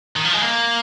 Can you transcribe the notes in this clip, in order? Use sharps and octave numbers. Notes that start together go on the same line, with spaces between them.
D#3
F3
G#3
A#3